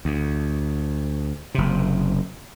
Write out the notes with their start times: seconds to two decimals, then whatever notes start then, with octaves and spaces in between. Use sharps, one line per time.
0.05 D2
1.55 F#1 C3